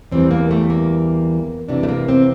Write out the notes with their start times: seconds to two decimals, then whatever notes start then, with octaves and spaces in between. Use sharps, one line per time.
0.11 E2 E3 G3 C4
0.31 A#3
0.51 A3
0.70 A#3
1.68 F2 C3 E3 D4
1.83 A3
1.88 A#3
2.08 C4